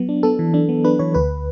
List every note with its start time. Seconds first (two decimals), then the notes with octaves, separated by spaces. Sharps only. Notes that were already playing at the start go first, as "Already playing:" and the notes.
Already playing: F#3 B3
0.09 D4
0.23 B3 A4
0.39 E3
0.54 D4
0.69 B3
0.85 D4 B4
0.99 E3 C#5
1.14 D2 B4